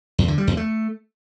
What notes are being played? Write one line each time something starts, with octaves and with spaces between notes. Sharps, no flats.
E2
D3
G3
E2
A3